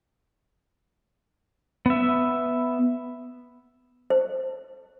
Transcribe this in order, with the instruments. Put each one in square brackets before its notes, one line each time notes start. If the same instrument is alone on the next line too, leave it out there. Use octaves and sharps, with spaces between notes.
[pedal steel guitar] B3 E5
[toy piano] C5